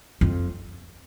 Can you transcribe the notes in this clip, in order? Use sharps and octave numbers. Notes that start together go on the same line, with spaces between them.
F2